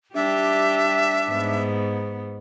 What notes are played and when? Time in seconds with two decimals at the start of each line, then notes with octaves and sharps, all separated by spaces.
0.15 G3 D4 G4 E5
1.30 G#2 B3